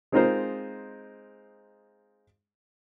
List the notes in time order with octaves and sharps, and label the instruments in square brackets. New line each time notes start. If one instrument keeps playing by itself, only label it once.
[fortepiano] G#3 C4 D#4 F4 A#4 C5